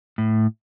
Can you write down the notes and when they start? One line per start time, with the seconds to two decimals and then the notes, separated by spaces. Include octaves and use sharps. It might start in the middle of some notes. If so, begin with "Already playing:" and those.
0.18 A2